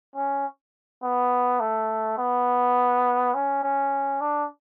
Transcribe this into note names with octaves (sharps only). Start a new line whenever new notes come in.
C#4
B3
A3
B3
C#4
C#4
D4